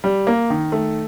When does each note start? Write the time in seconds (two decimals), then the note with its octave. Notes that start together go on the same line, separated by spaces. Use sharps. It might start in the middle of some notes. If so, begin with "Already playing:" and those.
0.04 G3
0.27 A#3
0.50 D#3
0.72 A3